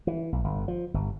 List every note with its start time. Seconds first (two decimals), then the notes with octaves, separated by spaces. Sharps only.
0.07 E3
0.32 B1
0.44 G1
0.68 F3
0.94 G1